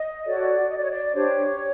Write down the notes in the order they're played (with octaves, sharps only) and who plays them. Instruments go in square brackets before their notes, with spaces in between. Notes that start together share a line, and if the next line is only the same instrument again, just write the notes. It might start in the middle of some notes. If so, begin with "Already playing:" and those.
Already playing: [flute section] D#5
F#4 A4 C#5 D5
D#5
D5
C#5
D5
D4 G4 C5 C#5